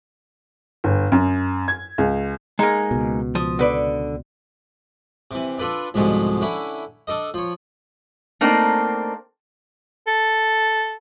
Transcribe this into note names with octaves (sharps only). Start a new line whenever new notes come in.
G1
F#2
G#6
C#2
G#3 A#3 D#4 G#5
C#2 B2
F3 D#6
D3 B4 D5
C3 E3
D4 F4 A4 B4 D5
C2 G#2 B2 D3 F3 G#3
D3 C#4 E4
D4 A4 D#5
F3 C#5
A3 A#3 C4 D4 D#4
A4